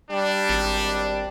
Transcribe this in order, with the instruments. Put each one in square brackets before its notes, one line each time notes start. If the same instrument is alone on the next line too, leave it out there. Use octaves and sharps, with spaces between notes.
[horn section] G3 D4
[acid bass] G#1